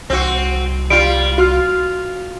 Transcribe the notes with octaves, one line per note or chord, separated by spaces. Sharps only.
C2 C4 F#4
G3 F4 D7
F4 F#4 F6